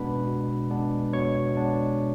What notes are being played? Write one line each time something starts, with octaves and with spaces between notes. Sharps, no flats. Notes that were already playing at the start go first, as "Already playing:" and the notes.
Already playing: B2 G#3 B3 D4 B4 B5
B2
G#3 B3 D4
B2 C#5 C#6
G#3 B3 D4